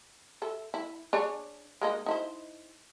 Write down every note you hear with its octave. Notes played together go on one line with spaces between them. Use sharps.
A4 E5
E4
D4 G#4 C#5
G#3 A#3 D#4
D#4 E4 C5